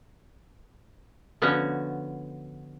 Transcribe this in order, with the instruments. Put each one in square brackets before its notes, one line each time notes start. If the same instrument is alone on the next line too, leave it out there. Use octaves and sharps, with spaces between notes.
[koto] D3 F3 B3 C#4 F#4